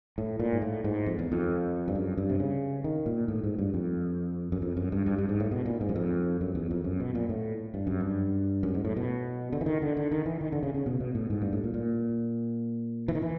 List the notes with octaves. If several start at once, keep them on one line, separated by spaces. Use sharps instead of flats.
A2
A#2
G#2
A2
G#2
F2
E2
F2
G2
F#2
G2
C3
C#3
D#3
A#2
A2
G#2
G2
F2
F#2
F2
F#2
G2
G2
G2
G#2
A2
B2
A#2
G#2
F#2
F2
F#2
E2
F2
F#2
B2
A#2
A2
G2
F#2
G2
F#2
G#2
A2
B2
D3
E3
D#3
D3
D3
D#3
E3
D#3
D3
C#3
C#3
B2
B2
A2
G#2
G2
A2
A#2
A#2
E3
D#3
E3